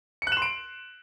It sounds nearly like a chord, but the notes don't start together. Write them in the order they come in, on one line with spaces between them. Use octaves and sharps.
C#7 F#6 E7 C6 D7